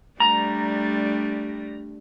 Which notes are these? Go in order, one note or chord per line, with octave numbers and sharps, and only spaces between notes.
G3 A3 D4 A#5